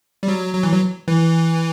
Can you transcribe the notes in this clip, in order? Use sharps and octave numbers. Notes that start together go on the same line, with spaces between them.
G3
F#3
F#3
E3
F#3
E3